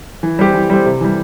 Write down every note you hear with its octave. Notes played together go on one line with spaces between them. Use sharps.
E3
G3 C4 G4
E3
G3 C4 G4
C3
E3 G3